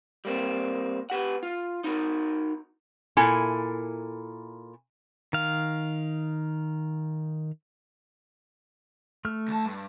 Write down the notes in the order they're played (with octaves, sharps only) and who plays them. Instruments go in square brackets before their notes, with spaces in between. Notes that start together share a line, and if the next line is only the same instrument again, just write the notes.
[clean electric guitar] G3 A#3 C4
B3 G4 F#5
F4
D#4 F#4 A#4
[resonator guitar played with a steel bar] A#2 E4 A4 A#4 G#5
[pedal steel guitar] D#3 F5
A3 F6
[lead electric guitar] D2 A5
G2